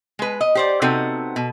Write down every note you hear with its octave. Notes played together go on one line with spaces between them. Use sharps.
G#3 B4
D#5
G4 C5 D5
C3 B3 C4 D#4 F#4 A4
B2